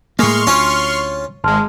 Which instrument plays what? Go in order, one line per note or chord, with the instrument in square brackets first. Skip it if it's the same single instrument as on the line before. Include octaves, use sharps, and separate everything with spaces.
[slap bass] A2 A#3 [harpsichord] G#3 [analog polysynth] C6 C#6 F6
[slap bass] D2 [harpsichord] C#4 F4 C#5
[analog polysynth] G#1 G#3 [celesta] A5 C6 F6